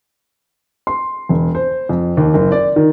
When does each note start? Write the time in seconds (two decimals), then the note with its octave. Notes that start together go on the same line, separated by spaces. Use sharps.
0.87 C6
1.29 E1
1.55 C5
1.89 F2
2.17 D#2
2.34 F#1
2.52 D5
2.76 D#3